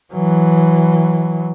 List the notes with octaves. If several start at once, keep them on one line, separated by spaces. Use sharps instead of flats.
E3 F#3